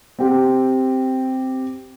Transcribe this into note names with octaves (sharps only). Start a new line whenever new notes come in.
C4 G4